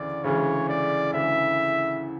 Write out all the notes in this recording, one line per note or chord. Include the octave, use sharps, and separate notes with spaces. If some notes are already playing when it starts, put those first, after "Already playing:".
Already playing: D2 C#3 E3 D5
D2 C#3 E3 G#3 C#5
D5
D2 C#3 E3 G#3 E5